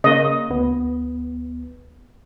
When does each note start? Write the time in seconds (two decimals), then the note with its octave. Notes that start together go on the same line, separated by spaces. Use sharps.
0.04 C#3 A#3 D#5
0.50 D2 B3